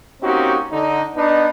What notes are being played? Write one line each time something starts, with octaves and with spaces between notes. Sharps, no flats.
A#3 C4 C#4 D#4 F#4 G4
D3 D#4
B3 D4 D#4